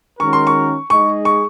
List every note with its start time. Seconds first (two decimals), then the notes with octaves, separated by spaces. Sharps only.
0.20 D#3 G#3 C#4 F#4 A#4 C#6
0.33 C6
0.47 C#6
0.90 G#3 D#4 G#4 D#5 C#6
1.25 C#6